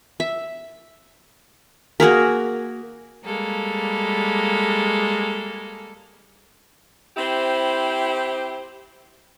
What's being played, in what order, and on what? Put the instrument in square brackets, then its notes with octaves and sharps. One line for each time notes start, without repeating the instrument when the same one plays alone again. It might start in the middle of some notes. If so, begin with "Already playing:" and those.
[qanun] E5
A#3 F#4 G#4 A#4
[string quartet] G3 G#3 A#3 A4
[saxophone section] C4 E4 G4 C5